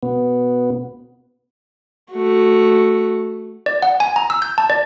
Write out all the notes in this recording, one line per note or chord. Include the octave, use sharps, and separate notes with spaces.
B2 B3
A3 F#4
D5
F#5
G#5
A#5
E6
G6
A5
D5